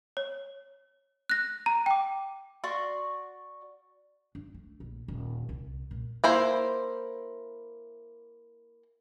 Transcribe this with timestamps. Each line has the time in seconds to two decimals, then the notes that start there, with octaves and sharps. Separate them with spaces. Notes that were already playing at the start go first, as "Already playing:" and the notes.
0.17 C#5
1.30 F#6 A#6
1.66 A#5
1.86 G5 D6
2.63 F#4 D5 C6 C#6
4.35 D4
4.54 A3
4.80 A#1
5.08 D#1
5.49 C2
5.91 A#2
6.24 A#3 E4 C5